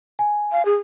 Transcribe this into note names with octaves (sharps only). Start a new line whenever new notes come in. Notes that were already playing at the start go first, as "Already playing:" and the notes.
G#5
F5
G#4